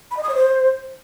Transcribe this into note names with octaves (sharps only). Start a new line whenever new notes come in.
B5
D#5
D#6
C#5
C5